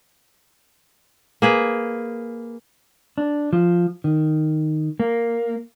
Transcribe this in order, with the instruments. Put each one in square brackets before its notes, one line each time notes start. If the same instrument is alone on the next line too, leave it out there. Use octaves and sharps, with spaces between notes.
[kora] A#3 G#4 B4
[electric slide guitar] D4
F3
D#3
A#3